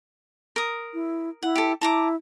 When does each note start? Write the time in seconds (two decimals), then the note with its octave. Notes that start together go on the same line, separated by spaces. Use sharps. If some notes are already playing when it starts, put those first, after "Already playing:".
0.56 A#4 D#6
0.94 E4
1.43 E4 F#5
1.55 G4 A4
1.81 E4 A5 A#5 D6